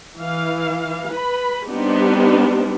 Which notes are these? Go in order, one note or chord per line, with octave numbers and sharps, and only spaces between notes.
E3 F5
B4 B5
G3 B3 C4 D4 D#4 G4